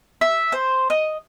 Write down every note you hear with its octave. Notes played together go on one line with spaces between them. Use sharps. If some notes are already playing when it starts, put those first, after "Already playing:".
E5
C5
D#5